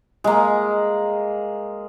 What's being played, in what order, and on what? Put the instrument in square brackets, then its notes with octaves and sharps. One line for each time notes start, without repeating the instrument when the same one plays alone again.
[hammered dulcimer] G#3 A#3